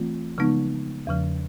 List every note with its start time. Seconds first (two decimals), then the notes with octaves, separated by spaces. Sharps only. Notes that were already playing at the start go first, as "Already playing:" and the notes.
Already playing: E3 A3 C4 F4
0.38 C#3 F3 G#3 B3 D#4
1.07 E2 C#3 F3